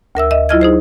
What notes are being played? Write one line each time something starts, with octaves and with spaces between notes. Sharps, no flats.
D2 A#4 E5 E6
D#5 E5
F#3 E4 F4 D#5 F6 G#6
D#4 G#4 C5